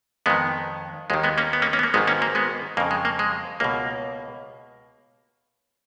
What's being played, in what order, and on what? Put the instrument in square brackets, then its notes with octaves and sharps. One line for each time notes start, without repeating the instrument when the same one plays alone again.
[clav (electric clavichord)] F2 D#3 G#3 B3
D#2 D#3 G#3
G#3 B3
A#3 C#4
B3
A#3 C#4
A#3 C#4
B3
A#3
G#1 G#2 D#3 G#3 B3
A#3 C#4
A#3
G#3 B3
F2 A#3
C#3
G#3
A#3
G#3
C#2 B2 A#3